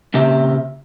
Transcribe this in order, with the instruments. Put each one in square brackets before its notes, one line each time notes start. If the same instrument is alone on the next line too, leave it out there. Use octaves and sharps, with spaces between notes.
[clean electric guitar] A#2 C#3 C4 G4 E5